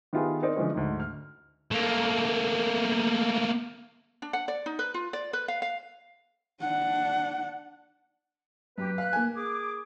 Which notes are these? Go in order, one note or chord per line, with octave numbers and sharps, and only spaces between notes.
D#3 B3 E4 F4 G4 G#4
C4 D#4 A#4 C5 D5
D3 E3 F3 G#3 C#4 D#4
D2 G#2
F6
A3 A#3
D4
F#5
D5
D#4
B4
F4
D5
B4
F5
F5
D4 F#5
F#2 G4 B4
F5 F#6
A#3 G#5
G#4 D6